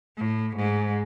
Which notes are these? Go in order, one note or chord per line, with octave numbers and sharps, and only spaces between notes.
A2
G#2